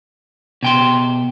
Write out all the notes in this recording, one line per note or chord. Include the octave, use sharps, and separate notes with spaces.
B2 G5 C6